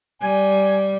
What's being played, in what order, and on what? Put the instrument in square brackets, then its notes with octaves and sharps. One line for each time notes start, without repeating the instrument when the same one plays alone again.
[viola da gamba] G3 [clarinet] G#5